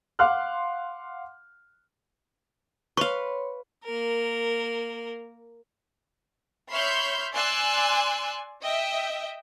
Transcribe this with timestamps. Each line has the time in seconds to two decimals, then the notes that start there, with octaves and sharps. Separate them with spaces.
0.19 F5 F#5 C6 D6 F6 F#6
2.97 B4 C#5 F5 C6 C#6
3.84 A#3 A#4
6.71 C#5 E5 B5 C6 F6 G6
7.35 D5 G#5 C6 E6 F#6
8.61 D#5 E5 G5